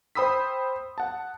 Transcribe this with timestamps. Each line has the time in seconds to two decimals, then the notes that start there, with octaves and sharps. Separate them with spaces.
0.15 C5 G5 B5 D#6 E6 B6
0.98 F#5 A5